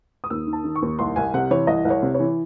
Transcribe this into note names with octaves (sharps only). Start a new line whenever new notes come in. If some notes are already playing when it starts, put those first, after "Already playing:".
D#6
D#2 E6
D#3
A5
D#3
C#6
D#2
C2 C6
C2 G#5
C3 F#5
E3 C#5
C2 D#5
C2
C#5
C3
C#5
E3